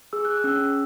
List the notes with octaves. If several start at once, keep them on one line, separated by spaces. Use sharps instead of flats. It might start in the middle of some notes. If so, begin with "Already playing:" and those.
G#4 E6
F#6
E6
C#4